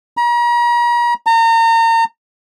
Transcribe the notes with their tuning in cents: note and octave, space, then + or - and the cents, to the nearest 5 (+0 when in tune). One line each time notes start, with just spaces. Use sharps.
A#5 +40
A#5 -35